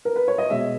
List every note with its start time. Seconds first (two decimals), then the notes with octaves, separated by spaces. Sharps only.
0.05 A#4
0.16 B4
0.28 C#5
0.38 D#5
0.50 B2 G#3 B3 E5